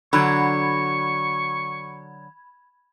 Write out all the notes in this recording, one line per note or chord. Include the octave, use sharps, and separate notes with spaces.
D3 F#3 B5 C#6 G#6